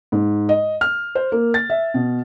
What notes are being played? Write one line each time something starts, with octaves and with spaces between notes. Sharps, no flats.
G#2
D#5
F6
C5
A#3
A6
E5
B2